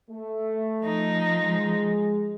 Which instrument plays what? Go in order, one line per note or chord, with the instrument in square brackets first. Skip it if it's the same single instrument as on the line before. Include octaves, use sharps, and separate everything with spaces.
[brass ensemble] A3
[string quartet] F3 D#4
[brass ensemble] G#3